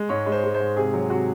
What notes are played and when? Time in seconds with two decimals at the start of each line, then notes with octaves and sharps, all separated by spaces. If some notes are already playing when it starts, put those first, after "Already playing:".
Already playing: G#3
0.09 G#2 C#5
0.26 G#3
0.32 C5
0.44 G#3
0.54 C5
0.60 G#2
0.77 C3 G#4
0.94 F#3
1.10 C3 F#4